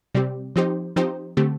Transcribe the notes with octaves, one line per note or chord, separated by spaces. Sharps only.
C3 G3 C4 G4
F3 C4 D#4 G4 C5
F3 C4 D#4 G4 C5
D3 A3 C4 G4